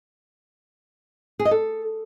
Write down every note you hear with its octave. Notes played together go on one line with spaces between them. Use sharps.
G#4
D#5
A4